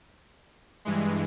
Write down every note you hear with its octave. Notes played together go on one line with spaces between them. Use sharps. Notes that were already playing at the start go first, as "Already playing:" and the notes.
G2 E3 G#3